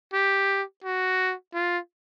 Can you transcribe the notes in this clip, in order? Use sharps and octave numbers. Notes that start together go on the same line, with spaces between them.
G4
F#4
F4